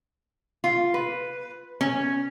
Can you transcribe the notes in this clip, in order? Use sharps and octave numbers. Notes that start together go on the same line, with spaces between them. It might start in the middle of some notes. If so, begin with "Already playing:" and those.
F4
B4
C#4